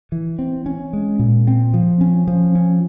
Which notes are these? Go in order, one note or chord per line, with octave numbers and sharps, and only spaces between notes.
E3
C4
C#4
G#3
A#2
C4
F3
C#4
F3
C#4